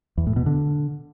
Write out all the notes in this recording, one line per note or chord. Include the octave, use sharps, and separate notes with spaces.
E2
A2
B2
D3